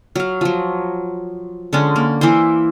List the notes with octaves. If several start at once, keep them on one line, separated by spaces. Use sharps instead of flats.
F#3 F5
F3 F#3
D3 G#3 C#4
A#3
E3 A#3 E4 C5